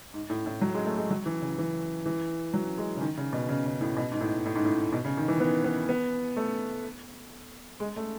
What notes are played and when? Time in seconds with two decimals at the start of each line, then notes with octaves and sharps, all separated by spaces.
0.14 G#2
0.30 A2
0.46 A2
0.62 F#3
0.74 G#3
0.86 A3
0.97 G#3
1.11 F#3
1.26 E3
1.41 C#3
1.58 E3
2.06 E3
2.54 F#3
2.78 G#3
2.97 C#3
3.01 D#3
3.17 C#3
3.33 B2
3.49 C#3
3.65 C#3
3.81 A2
3.97 B2
4.12 G#2
4.21 A2
4.46 A2
4.55 G#2
4.65 A2
4.93 B2
5.05 C#3
5.17 D#3
5.28 E3
5.40 B3
5.64 B3
5.89 B3
6.36 A3
7.80 G#3
7.96 A3